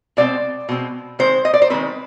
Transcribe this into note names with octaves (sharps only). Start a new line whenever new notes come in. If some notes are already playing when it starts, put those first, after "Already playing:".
B2 G#3 C4 D5
B2 G#3 C4
D#3 G#3 C4 C5
D#5
D5
C5
D#3 G#3 C4 B4